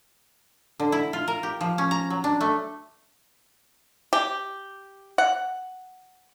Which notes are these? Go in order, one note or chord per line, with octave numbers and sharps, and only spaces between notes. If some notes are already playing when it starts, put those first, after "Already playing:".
D3
E4
F4
A#4
G4
F3
C#4
A#5
F#3
D4
A3
G4
F#5